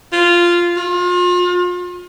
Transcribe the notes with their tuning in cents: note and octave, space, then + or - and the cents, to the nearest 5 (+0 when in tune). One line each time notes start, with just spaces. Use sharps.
F4 -10
F4 +35